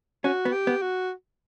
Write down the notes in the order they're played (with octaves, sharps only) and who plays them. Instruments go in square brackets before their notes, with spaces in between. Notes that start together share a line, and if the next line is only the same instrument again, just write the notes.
[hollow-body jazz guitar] C#4 [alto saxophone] F#4
[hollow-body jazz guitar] B3
[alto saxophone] G4
[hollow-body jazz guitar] B3
[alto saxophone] F#4